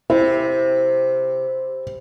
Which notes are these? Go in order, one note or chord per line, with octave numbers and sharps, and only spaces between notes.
C3 E4 C5